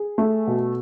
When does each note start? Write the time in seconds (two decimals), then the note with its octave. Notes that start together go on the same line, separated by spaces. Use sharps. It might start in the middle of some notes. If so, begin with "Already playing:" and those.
Already playing: G#4
0.18 A3
0.47 B2